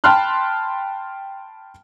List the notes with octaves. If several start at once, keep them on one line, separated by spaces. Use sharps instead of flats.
G5 A5 B5 C6 F6 F#6